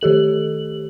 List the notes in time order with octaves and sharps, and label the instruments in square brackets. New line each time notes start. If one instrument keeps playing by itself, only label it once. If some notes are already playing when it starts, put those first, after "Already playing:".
[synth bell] D#3 G4 A4 F#7